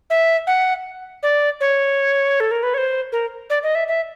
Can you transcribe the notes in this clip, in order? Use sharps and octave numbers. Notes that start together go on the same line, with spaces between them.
E5
F#5
D5
C#5
A4
A#4
B4
C#5
C5
A#4
D5
D#5
E5
E5